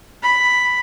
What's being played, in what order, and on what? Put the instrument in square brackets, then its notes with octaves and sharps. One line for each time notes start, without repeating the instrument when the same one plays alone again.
[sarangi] B5